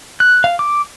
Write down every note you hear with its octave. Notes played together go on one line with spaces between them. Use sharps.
F#6
F5
D6